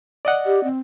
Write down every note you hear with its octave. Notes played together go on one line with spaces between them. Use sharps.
D5 D#5 F#5
G4
C4